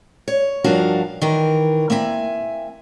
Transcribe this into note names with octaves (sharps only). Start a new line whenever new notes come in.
C#5
G2 F3 D4 F#4 A#4 F5
D#3 E3 A#4
A#3 C4 E5 G#5